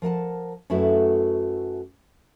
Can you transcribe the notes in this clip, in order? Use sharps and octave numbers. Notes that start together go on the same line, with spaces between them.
F3 A#4 F#5 A5
F#2 A3 E4 F#4 A4 B4